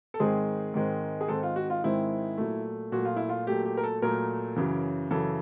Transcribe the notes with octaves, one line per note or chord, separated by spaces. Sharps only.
A4
G#2 D#3 G#3 C4 G#4
G#2 D#3 G#3 C4
G#4
G#2 D#3 G#3 C4 A4
F4
F#4
F4
G#2 D#3 G#3 C4 E4
A#2 F#3 A3
A#2 F#3 A3 F#4
F4
E4
F4
A#2 F#3 A3 G4
G4
A#4
A4
A#2 F#3 A3 A#4
F#2 C#3 E3
F#2 C#3 E3 A4